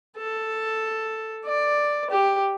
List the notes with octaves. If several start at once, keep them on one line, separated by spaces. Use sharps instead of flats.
A4
D5
G4